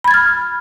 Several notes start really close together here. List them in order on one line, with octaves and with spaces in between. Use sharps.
B5 G#6 A6 F6